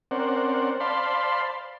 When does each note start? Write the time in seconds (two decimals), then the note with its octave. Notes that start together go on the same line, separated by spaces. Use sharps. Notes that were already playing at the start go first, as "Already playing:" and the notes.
0.11 C4 C#4 A#4 C5 D5 F#5
0.80 C5 D5 F5 A5 B5 C6